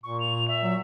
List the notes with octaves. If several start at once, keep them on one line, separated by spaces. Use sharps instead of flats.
A#2 C#6
F7
E5
F#3